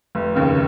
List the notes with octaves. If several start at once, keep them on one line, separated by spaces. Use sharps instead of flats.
F1
D#2 C#3